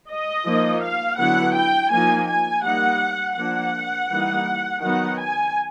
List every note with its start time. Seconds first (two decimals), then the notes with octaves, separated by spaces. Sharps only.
0.10 D#5
0.45 F3 A#3 D#4
0.82 F5
1.18 D3 F#3 B3 E4 F#5
1.54 G5
1.91 F3 A#3 D#4 G#5
2.28 G#5
2.64 G3 A#3 D#4 F#5
3.37 F3 A#3 D4 F#5
4.10 E3 G3 A#3 D#4
4.82 D#3 F#3 B3 D#4 F#5
5.19 G#5